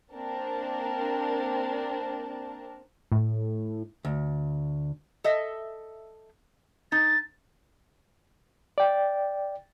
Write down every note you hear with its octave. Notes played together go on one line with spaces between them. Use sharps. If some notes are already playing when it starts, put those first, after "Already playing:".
A#3 C4 D4 A#4 A5
A2
D2
A4 D#5 E5
D#4 A6
D5 G5